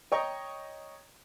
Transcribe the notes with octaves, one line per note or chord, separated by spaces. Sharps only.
C#5 D#5 G5 A#5 C#6 D#6